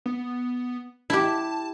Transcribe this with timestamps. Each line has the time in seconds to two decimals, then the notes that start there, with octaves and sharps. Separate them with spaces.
0.06 B3
1.10 E4 G4 A5